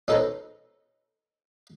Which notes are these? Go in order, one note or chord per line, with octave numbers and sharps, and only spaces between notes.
C#4 D#4 A4 B4 C5 A#5